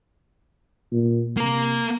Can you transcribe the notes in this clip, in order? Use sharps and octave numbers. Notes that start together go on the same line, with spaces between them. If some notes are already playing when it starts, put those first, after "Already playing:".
A#2
C3 A#3 A#4